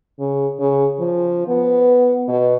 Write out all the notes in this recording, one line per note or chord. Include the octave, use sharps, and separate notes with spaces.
C#3
C#3
F3
B3
B2